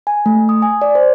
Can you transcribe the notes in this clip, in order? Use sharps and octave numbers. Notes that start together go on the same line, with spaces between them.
G#5
A3
D#6
G#5
D5
C5